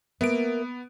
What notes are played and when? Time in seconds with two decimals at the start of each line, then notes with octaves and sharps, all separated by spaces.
0.21 A#3 B3 E5 D7